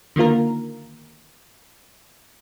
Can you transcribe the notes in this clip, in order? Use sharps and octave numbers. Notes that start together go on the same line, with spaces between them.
D3 D#3 A#3 F4 A#4